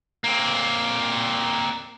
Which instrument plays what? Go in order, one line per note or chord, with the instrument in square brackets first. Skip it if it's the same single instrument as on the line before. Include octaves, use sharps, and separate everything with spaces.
[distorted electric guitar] A#3 C4